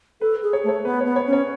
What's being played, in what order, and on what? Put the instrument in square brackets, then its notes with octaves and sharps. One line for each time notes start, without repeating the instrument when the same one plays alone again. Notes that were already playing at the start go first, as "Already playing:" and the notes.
[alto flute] A4 [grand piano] B4
[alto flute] G#4
[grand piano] C#5
[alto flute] A3 [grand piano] C#5
[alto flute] B3 [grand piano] B4
[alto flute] B3 [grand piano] C#5
[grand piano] C#5
[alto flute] C#4
[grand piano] C#5